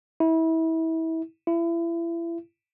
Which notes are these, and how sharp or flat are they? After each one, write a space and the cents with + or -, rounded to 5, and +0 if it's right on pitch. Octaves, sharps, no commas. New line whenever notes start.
E4 -30
E4 +30